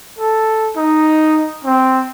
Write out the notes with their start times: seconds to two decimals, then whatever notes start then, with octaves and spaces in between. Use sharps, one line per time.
0.19 A4
0.76 D#4
1.65 C4